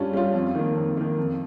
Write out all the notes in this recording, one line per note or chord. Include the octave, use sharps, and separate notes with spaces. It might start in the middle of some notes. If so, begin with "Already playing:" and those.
Already playing: G2 G3 C#4 F4
G3 C#4 F4
F2
D#3 A#3
F2
D#3 A#3
F2